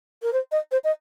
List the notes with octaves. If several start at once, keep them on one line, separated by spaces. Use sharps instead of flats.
A#4
C5
D#5
C5
D#5